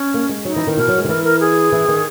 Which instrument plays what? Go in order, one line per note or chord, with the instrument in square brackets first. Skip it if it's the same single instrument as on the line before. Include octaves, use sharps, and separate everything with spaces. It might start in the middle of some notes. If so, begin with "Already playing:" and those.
Already playing: [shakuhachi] C#4
[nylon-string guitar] A#3
G#3
[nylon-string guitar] F#3 [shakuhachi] D#4
[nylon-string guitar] E3
D#3
[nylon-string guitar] B2 [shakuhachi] A#4
[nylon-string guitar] F#3
G#3
D#3
[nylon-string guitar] E3 [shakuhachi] A#4
[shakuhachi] A#4
G#4
[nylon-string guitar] E3
D#3